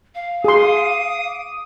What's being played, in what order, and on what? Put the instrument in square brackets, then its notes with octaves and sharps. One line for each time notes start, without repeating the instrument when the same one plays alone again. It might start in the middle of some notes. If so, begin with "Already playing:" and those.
[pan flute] F5
[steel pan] G#4 C6 [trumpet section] D6 D#6